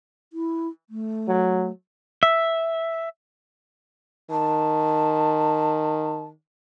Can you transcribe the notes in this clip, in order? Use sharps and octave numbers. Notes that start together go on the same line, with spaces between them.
E4
A3
F#3
E5
D#3 A5